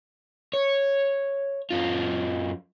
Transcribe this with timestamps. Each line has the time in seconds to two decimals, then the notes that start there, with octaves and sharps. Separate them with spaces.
0.53 C#5
1.71 F#2 F4